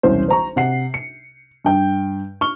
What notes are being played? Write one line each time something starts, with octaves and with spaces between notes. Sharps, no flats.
E1 C2 C#4 C5
C5 A#5 C#6
C3 F#5 C7
C#7
G2 G5 G6
C#6 F6 G7